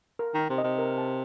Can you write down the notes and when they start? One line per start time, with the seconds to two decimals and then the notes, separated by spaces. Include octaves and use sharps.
0.19 A#4
0.34 D#3 D#4
0.50 C3
0.58 D#5
0.64 C3
0.79 A#4
0.98 A5